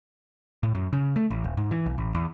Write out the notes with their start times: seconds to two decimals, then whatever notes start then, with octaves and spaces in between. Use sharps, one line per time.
0.63 A2
0.75 F#2
0.93 C#3
1.16 A3
1.31 A1
1.44 D#1
1.57 G#2
1.71 E3
1.86 B1
1.98 A1
2.15 E2